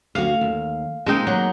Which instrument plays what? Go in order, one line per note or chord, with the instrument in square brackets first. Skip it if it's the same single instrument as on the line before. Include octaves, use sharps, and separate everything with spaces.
[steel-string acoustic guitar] D2 F#4 [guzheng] F5
[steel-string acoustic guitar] D#2
[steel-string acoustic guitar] A#2 C4 G5 [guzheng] G#3 D#4
[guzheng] F#3 [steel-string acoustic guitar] A#3